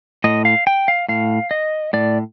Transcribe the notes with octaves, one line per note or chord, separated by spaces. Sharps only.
A2 D#5
F5
G5
F5
A2 F5
D#5
A2 D5